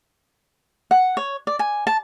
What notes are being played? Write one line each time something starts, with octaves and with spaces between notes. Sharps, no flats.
F#5
C#5
D5
G#5
A5